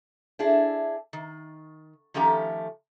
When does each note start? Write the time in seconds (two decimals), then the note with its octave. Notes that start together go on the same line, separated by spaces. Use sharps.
0.39 D4 E4 G#4
1.13 D#3
2.14 D#3 F3 A3 C#4 G4 A#5